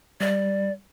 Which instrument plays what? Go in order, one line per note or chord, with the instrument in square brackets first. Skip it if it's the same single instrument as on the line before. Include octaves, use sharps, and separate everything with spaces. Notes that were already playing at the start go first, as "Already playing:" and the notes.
[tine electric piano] G3 [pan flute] D5